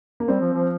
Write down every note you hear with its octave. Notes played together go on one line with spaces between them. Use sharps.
A#3
G3 C4
F3
F3